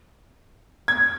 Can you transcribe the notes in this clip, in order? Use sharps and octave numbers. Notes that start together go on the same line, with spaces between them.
G#6